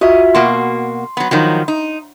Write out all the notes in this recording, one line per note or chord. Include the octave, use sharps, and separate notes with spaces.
F4 F#4 D#5 E5
B2 A#3 F#4 C6 C7
F#3 B3
D#3 F3 F#3
D#4